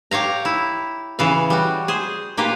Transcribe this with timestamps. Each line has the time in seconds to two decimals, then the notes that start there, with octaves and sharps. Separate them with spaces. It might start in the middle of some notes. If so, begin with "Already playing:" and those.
0.11 G4 C#5 F5 A#5
0.45 E4
1.19 C#3 E3 F5
1.50 G3 F#4
1.88 G#4 C5
2.37 A#2 A#3 G4 B4 F5